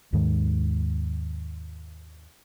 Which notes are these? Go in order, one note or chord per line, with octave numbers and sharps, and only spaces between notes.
D#2 G#2 D#3 G#3